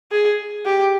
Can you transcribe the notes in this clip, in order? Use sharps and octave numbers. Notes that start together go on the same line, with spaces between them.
G#4
G4